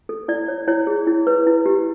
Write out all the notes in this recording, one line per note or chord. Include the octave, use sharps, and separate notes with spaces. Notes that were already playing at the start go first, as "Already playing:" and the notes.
A4
E4 D5
C#5
E4 C#5
G#4
E4
B4
E4
G4